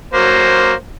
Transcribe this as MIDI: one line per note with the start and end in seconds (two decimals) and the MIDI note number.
0.14 0.73 54
0.14 0.73 58
0.14 0.73 72